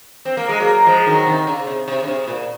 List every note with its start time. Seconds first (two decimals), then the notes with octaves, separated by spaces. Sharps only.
0.25 C4
0.37 A#3
0.49 G#3
0.60 F#3 A#3
0.86 F3 G#3
1.06 D#3 F#3
1.26 C3 D#3
1.47 C#3
1.67 C3
1.88 C3
2.03 C#3
2.08 C3
2.27 A#2